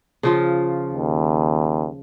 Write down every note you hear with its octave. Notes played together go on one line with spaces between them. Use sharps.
C#3 F3 F4
D#2